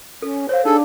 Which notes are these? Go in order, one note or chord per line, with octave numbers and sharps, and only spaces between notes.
C#4 A4
C5 C#5 F5
D4 D#4 G#4 A4